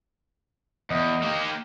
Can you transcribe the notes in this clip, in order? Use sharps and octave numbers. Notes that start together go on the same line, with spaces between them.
E2 D#5 D#6
A#3 G4